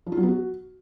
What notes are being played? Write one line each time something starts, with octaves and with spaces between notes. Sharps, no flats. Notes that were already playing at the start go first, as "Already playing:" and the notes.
F3
F4
F#3
B3
F#4